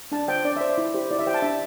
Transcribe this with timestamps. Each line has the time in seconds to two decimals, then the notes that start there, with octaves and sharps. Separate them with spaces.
0.12 D4 A5
0.28 C5 G5
0.44 D4 D5
0.57 C5 E5
0.69 D5
0.78 E4
0.94 G4 C5
1.11 E4 D5
1.19 E5
1.26 G4 C5 G5
1.34 A5
1.42 D4 E5